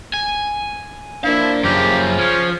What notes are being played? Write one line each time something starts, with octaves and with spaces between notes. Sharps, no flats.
G#5
A#3 D4 E4 C5 F5
F#2 C#3 A#3 G4
F3 C#4